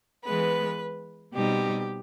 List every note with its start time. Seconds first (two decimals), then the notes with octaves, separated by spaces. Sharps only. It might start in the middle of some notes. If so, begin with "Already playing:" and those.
0.24 E3 G#3 B3 B4
1.34 B2 G3 C4 D#4 G4